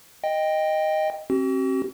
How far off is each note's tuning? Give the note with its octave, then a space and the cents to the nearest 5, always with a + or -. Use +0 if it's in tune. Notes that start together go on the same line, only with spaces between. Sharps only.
D#5 +0 G5 +10
C4 +35 F#4 +45